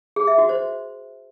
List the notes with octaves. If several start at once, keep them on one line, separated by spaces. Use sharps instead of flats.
G#4
E5
F#4
C5